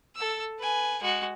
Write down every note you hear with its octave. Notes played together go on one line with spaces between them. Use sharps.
A4 E6
B4 G#5
G#3 F#4